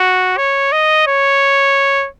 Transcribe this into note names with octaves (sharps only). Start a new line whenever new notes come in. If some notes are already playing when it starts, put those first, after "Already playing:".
Already playing: F#4
C#5
D#5
C#5